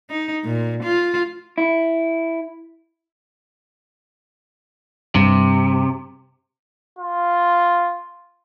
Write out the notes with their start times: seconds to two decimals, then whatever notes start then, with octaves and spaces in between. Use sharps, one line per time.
0.10 D#4
0.44 A#2
0.83 F4
1.58 E4
5.15 G2 C3
6.99 F4